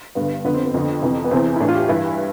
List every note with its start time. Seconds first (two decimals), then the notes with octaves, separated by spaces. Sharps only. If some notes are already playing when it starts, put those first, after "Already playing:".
0.15 G2 D3 B3
0.44 F2 D3 B3
0.54 C4
0.65 B3
0.74 F2 D3
1.02 F2 C3 E3
1.25 B3
1.31 E2 C3 E3 C4
1.56 E4
1.60 A2 E3 D4
1.68 F4
1.75 G4
1.88 G2 E3 E4